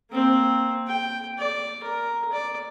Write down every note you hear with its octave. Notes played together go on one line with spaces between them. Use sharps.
A#3 C4
G5
D5
A#4
D5